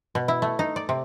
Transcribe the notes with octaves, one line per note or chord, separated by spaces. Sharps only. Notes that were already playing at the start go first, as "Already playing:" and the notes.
B2
E4
A3
D#4
D5
C3